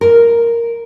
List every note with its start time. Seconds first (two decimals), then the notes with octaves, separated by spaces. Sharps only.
0.01 A#4